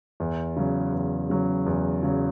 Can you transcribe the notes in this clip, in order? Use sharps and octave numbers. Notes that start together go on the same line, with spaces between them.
E2
C#3 F#3
E2
C#3 F#3
E2
C#3 F#3